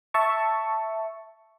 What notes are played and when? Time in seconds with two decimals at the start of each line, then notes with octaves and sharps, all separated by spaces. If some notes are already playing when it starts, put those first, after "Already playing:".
0.14 E5 A5 C#6